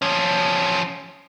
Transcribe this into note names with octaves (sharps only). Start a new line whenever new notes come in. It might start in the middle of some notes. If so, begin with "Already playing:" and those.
F3 C#4